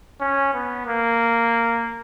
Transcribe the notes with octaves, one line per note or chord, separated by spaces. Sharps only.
C#4
B3
A#3